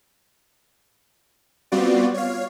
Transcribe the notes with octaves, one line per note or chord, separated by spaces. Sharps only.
G3 B3 C4 F4 F#4 D5
C#5 F5